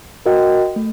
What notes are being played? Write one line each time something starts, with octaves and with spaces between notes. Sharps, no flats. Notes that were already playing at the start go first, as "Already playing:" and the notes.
F#4 A#4 D#5 G5
A3